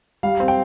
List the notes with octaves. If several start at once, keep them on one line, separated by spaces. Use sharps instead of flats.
G3 F5
C4
G5